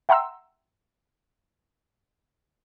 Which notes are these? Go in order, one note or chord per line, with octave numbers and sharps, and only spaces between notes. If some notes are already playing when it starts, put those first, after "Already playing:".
E5 F#5 G5 A#5 C6 E6